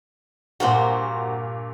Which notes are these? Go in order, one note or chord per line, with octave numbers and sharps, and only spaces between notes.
G2 A#2 F#4 A#4 C5